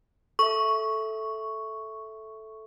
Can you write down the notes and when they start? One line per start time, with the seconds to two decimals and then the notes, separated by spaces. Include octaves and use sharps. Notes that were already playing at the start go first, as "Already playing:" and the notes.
0.39 A4 E5 C#6